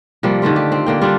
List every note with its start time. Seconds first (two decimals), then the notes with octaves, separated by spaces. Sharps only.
0.23 C3 F3 G3 A#3
0.42 D3 D#3 A3 F4
0.56 G4
0.72 C4
0.86 D3 A#3 G5
1.01 D3 G3 D4 F4